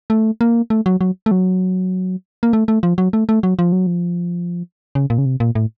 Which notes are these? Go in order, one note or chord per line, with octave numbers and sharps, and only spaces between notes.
A3
A#3
A3
F#3
F#3
A3
F#3
A#3
A3
A3
F3
F#3
A3
A3
F#3
F3
F#3
F3
C#3
A#2
C#3
C3
A#2
A2